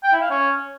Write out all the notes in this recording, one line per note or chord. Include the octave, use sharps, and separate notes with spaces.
G5
E4
F5
C#4